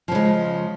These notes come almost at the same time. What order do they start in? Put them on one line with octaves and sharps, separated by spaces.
F3 C#3 G#3